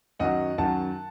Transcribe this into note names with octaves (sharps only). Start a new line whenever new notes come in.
F#2 D#3 F#3 D#5 F#5
F#2 D#3 F#3 F#5 A5